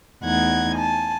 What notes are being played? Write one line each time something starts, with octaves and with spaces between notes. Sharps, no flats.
E2 A3 D#4 F#5 G#6
G#5 A5